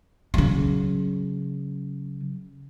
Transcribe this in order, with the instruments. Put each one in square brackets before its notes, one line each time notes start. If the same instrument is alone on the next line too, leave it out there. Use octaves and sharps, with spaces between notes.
[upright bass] C#3 F#3